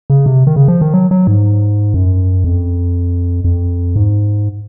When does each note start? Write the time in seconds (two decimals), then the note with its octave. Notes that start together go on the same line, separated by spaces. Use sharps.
0.10 C#3
0.26 C3
0.47 D#3
0.56 C#3
0.68 F3
0.81 D#3
0.94 F#3
1.11 F#3
1.27 G#2
1.94 F#2
2.44 F2
3.44 F2
3.96 G#2